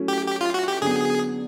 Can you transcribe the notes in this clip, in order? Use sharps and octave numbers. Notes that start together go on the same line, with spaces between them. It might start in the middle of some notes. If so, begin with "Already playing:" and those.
Already playing: F#3 A3 C#4 E4
G4
G4
F4
F#4
G4
D3 F#3 B3 G#4